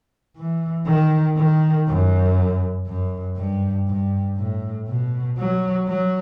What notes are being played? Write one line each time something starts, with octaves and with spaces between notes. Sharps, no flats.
E3
D#3
D#3
F#2
F#2
G2
G2
A2
B2
F#3
F#3